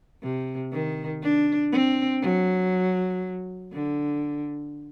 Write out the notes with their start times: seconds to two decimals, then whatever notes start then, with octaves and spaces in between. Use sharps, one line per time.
0.23 C3
0.72 D#3
1.22 D4
1.72 C4
2.22 F#3
3.72 D3